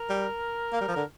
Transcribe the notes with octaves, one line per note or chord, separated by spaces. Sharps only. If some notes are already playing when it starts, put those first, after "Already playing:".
Already playing: A#4
G3
A#3
G3
F3
D3 A#4